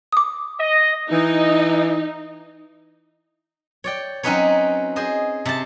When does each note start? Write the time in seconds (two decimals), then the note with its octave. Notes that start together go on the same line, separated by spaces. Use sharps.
0.13 D6 D#6
0.60 D#5
1.11 E3 D#4
3.84 C#5 D5 G5
4.23 F#3 C4 C#4 D#4 B4 C#5
4.96 G#4 C5 D#5
5.45 C3 A5